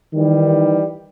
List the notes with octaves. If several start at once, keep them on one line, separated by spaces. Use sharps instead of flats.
D#3 E3 G3